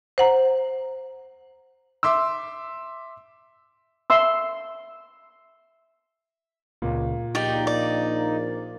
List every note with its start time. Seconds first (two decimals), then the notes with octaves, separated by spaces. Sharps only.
0.18 C5 F#5 A#5
2.03 E5 C6 D6 E6
4.10 E5 C6 E6
6.82 C#2 A#2
7.35 A#1 A#3 D#4 G4 D5
7.67 D5